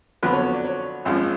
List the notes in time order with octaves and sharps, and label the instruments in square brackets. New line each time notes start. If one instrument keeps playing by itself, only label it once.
[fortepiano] F2 D3 F#3 B3 [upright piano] B4
[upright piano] C#5
C#5
D5
C#5
[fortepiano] G#1 F#2 F3 G#3